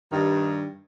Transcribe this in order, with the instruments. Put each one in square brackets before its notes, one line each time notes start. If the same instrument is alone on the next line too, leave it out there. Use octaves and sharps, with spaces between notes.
[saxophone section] G2 D#3